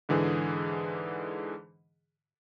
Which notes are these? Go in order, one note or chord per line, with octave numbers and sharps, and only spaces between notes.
G#2 D3 E3 G#4